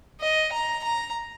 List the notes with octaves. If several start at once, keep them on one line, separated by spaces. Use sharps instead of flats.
D#5
A#5
A#5